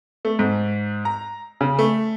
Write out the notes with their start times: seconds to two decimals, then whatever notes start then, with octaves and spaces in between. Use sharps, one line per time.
0.25 A3
0.39 G#2
1.05 A#5
1.61 C#3
1.79 A3